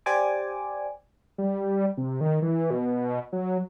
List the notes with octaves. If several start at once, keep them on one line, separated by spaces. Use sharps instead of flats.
G4 C5 D5 G#5 D6
G3
C3
D#3
E3
B2
F#3